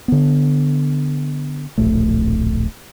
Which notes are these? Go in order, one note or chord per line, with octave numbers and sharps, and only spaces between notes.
D3 B3
D1 A#1 A3